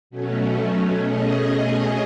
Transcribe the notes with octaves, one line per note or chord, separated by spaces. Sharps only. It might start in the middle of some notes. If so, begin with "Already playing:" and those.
B2 F#3 A3 C#4
B2 A3 C#4 G#4 D#5